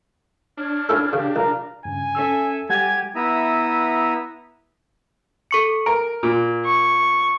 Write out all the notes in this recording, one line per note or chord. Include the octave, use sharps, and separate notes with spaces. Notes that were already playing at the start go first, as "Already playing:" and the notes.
D4 C#5 F6
C#4 E4 A4
C#3 G4
C2 A#4 F5 A#5
G2 C#3 G#5
C#4 A4 E5 E6
G3 G4 F#5 G#5 G#6 A6
B3 E4 E5 A#5 D#6
A4 C#6 C#7
A#4 D7
A#2
C#6